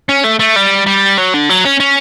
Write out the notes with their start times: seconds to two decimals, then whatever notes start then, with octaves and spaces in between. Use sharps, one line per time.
0.09 C#4
0.24 A3
0.40 A3
0.56 G3
0.87 G3
1.18 F#3
1.34 D3
1.49 F#3
1.65 C#4
1.80 C#4